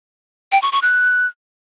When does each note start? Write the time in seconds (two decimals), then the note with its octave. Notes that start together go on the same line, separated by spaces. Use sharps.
0.52 G5
0.62 C#6
0.72 C#6
0.82 F#6